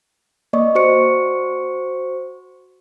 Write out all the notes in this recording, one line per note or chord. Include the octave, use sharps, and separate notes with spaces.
A#3 D5 D#5 C#6
F#4 C5 C#6 C#7